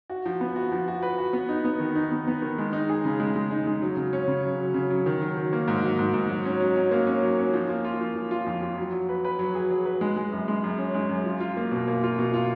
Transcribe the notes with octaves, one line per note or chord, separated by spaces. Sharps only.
F#4
F3
B3
F#4
F3
F#4
B4
F#4
B3
D#4
B3
D#3
D#4
B3
B3
D#3
G#3
D#4
G#4
C#3
G#3
G#3
D#4
G#3
F#3
C#3
C#4
C#3
F#3
F#3
C#3
F#3
D#3
F#3
D#3
A#3
G#2
F#3
G#2
G#2
F#3
C#4
F#3
C#4
A#3
C#4
F#3
C#4
F3
A#3
F4
F3
F3
F4
F2
F4
F#3
F#3
B4
B4
F#3
G#4
F#3
B4
G#3
G#3
F#2
G#3
F#2
C#4
G#3
F#2
F4
F4
A#3
B2
A#3
F4
B2
F4